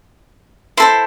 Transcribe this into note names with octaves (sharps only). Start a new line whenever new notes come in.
E4 A4 C5 C6